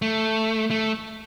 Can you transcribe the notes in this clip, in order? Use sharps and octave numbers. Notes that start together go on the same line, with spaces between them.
A3
A3